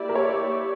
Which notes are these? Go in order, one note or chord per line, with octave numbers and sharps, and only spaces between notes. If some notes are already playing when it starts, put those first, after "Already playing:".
Already playing: A#3 E4 G4 D5
A#4
C#5